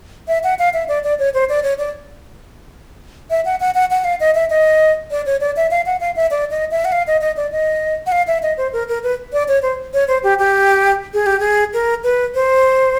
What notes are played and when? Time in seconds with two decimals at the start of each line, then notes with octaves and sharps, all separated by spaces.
0.28 E5
0.44 F#5
0.59 F5
0.74 E5
0.88 D5
1.04 D5
1.19 C#5
1.34 C5
1.49 D5
1.63 C#5
1.78 D5
3.30 E5
3.45 F#5
3.60 F#5
3.75 F#5
3.91 F#5
4.04 F5
4.20 D#5
4.35 E5
4.50 D#5
5.11 D5
5.26 C#5
5.41 D5
5.56 E5
5.71 F5
5.86 F#5
6.01 F5
6.16 E5
6.31 D5
6.51 D#5
6.71 E5
6.85 F#5
6.92 F5
7.07 D#5
7.21 D#5
7.37 D5
7.52 D#5
8.06 F#5
8.12 F5
8.27 E5
8.43 D#5
8.57 C5
8.73 A#4
8.88 A#4
9.03 B4
9.33 D5
9.48 C#5
9.62 C5
9.94 C#5
10.08 C5
10.23 G4
10.39 G4
11.14 G#4
11.26 G4
11.40 G#4
11.73 A#4
12.04 B4
12.35 C5